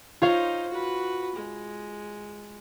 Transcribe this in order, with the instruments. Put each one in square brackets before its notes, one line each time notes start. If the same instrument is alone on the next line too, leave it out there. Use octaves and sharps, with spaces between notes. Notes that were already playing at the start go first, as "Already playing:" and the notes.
[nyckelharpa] D#4 C5 [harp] F4 C#5 F5
[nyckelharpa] F#4 B4
G#3